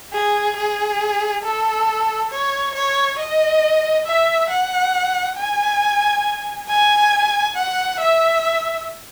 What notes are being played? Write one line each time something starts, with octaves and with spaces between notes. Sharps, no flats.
G#4
G#4
A4
C#5
C#5
D#5
E5
F#5
G#5
G#5
F#5
E5